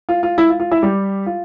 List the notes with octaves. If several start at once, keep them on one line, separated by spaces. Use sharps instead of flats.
F4
F4
E4
F4
F4
E4 E5
G3 G4
F4